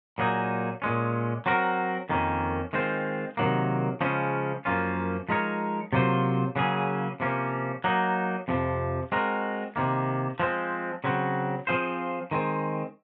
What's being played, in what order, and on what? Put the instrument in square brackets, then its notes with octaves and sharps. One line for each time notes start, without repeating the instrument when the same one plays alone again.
[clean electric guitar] A#2 F#3 A#3 D#4 G#4
A#2 G#3 C#4
F#3 C4 F#4 A#4
F2 D#3 A#3 C#4
D#3 G#3 C4 F4 C5
C3 D#3 F#3 A#3
C#3 F3 G#3 C#4
F#2 F3 A#3 C#4 F4
F3 G#3 D#4 A#4 C#5
C3 F#3 A#3 F4 C5
C#3 F#3 A#3 C#4 G#4
C3 F3 A#3 C#4
F#3 A#3 D#4
F2 C3 F3
G#3 C4 F#4 A#4
C3 D#3 A#3
F3 G#3 C4
C#3 F#3 C4 F#4
F3 C4 F4 G#4 C5
D#3 G#3 C4